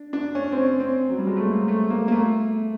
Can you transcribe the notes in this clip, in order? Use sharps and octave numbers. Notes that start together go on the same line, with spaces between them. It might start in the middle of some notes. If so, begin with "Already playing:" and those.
Already playing: D4
D4
C#4
C4
C#4
C4
F#3
G3
G#3
A3
A#3
A3
A#3
A#3
A3